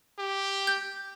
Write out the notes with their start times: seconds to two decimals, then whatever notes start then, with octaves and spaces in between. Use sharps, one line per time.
0.18 G4
0.67 G6